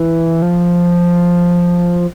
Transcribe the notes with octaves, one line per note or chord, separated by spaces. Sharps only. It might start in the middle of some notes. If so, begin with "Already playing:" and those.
Already playing: E3
F3